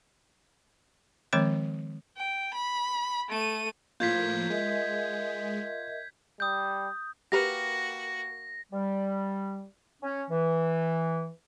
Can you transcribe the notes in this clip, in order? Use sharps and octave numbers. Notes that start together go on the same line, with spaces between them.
D#3 F3 G#3 C4 C#5 D6
G5
B5
A3 D#7
A2 F3 A#3 F4 G6 G#6 B6
G#3 A#4 D#5 E5
G3 D#6 G6
A#3 F#4 G4 A#4 B4 A#6
G3
C#4
E3